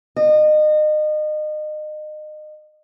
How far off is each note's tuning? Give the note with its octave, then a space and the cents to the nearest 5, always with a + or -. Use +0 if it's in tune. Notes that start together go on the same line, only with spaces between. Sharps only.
D#5 -30